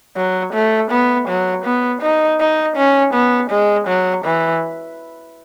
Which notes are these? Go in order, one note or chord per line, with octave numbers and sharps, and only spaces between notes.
F#3
A3
B3
F#3
B3
D#4
D#4
C#4
B3
G#3
F#3
E3